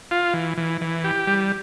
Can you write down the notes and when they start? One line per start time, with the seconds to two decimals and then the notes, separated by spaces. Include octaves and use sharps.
0.11 F4
0.34 E3
0.57 E3
0.81 E3
1.04 G4
1.27 G3